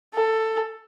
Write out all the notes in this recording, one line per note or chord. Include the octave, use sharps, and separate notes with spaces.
A4